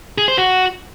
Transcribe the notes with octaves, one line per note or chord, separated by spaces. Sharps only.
G#4
C5
F#4